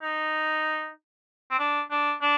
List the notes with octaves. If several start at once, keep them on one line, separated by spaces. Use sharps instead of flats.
D#4
C4
D4
D4
D4